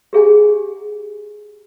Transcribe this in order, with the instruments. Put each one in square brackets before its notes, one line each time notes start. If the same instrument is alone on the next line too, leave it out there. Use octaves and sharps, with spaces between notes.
[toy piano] G4 G#4 F#5 G#5